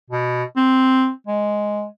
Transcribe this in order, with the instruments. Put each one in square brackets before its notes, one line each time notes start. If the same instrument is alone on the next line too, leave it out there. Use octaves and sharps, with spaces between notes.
[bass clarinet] B2
C4
G#3